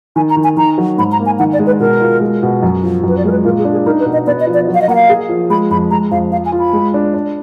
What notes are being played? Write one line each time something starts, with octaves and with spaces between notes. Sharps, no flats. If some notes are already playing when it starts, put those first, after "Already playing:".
D#3 G#5
A#5
D#3
G#5
D#3 A#5
F#3
G#2 B5
A#5
A#3
G#5
D#3 F#5
D5
G#3
B4
B2 A#4
F4
G#3
B2
F#2
F3
F#2 B4
D5
G#3 A#4
B4
A#2 A#4
G#4
D4
G#4
D#4 A#4
B4
B2
D#5
B3 D5
D#5
F3
D5
F#3
F5
D#5
A#3 F#5
F5
G#4
F3
G#3 B5
F2 B5
G#3 A#5
F2 F5
F3 F5
G#5
F4
B5
G#3
D4
D4